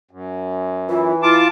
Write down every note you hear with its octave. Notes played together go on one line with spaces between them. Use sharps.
F#2
E3 F4
E4 F4 A5 D6